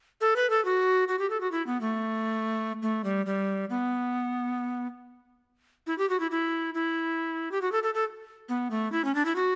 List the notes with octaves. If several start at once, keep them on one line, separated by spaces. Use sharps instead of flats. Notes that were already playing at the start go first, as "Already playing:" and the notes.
A4
B4
A4
F#4
F#4
G4
A4
F#4
E4
B3
A3
A3
G3
G3
B3
E4
G4
F#4
E4
E4
E4
G4
F#4
A4
A4
A4
B3
A3
E4
C#4
D4
E4
F#4